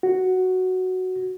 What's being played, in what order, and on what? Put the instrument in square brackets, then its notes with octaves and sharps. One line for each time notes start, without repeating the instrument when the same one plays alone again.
[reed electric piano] F#4